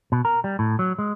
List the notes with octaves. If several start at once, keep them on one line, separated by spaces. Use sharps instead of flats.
B2
A#4
G3
A2
F#3
G#3